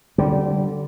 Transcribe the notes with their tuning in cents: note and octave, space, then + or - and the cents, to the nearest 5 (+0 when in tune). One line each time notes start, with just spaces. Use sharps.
D3 +0 G3 -25